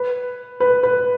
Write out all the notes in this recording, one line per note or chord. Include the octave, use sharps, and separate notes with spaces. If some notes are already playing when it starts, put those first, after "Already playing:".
Already playing: B4
B4
B4